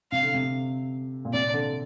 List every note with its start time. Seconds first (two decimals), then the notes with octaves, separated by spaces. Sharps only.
0.12 C3 F5
0.23 D3
0.34 C3
1.25 A#2
1.33 C3 D5
1.53 D3